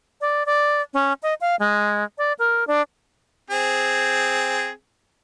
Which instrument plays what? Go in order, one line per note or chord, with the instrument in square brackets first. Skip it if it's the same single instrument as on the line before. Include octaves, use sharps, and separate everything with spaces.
[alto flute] D5
D5
C#4
D#5
F5
G#3
D5
A#4
D4
[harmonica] C4 G#4